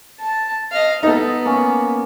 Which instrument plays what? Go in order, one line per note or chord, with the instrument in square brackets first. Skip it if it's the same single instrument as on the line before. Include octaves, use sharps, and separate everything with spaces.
[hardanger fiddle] A5
D#5 F5
[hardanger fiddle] B3 [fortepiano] D#4 A4
[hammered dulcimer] A#3 C#4